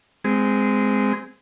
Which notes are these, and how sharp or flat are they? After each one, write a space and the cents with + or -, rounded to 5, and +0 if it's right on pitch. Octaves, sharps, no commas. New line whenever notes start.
G#3 -5 C4 -20